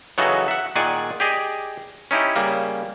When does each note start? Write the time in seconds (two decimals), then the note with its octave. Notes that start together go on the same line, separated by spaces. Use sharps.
0.18 C#3 E3 F#3 D#4 F#4 A4
0.48 E5 F#5
0.76 A#2 D#3 G#4 D5 F#5 G#5
1.20 G4 G#4 D5 D#5
2.11 C#4 D#4 E4 G4
2.36 C#3 G3 A#3